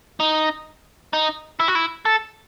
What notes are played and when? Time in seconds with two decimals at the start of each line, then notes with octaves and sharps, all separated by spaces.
0.20 D#4
1.13 D#4
1.60 E4
1.68 F#4
1.75 E4
2.06 A4